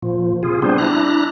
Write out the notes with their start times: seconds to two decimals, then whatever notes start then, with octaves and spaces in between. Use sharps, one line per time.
0.03 A#2 F3
0.43 C3 F4 G#4
0.62 G3 B3 C4 D4 G#4 C5
0.78 D4 E4 A#5 F#6